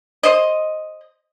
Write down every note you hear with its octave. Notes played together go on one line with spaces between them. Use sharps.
C5 D#5